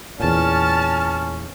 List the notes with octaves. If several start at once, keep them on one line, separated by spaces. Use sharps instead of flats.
E2 A#2 C#4 A5 F6